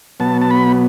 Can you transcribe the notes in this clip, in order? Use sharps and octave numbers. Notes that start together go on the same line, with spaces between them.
B2 F#3 B3 A5
A5
B5